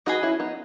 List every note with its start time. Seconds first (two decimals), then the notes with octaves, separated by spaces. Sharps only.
0.06 D#4 F#4 G#4 B4 D#5
0.23 C#4 E4
0.40 B3 D#4